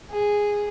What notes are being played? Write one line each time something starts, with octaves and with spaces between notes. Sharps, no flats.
G#4